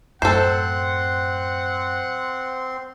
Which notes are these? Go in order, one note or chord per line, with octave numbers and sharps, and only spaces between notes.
F#2 A2 C4 A4 C5 F#5 C6